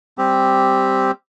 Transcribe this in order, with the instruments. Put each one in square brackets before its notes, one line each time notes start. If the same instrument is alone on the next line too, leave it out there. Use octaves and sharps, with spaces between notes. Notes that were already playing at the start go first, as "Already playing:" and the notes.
[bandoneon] G3 C4 G4